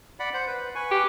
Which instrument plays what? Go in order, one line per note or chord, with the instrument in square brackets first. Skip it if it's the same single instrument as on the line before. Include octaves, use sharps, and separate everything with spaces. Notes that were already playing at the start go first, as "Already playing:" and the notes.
[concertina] D5 F#5 B5
C5 F#5
B4
B4 G#5 C#6
[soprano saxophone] G4